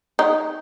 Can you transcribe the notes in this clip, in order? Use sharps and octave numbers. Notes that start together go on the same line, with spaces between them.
D#4